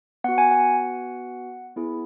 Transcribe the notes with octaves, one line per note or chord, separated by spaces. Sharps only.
B3 F#4 F#5
G#5
F#5
B3 E4 G#4